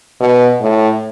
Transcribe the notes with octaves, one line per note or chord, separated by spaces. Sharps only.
B2
A2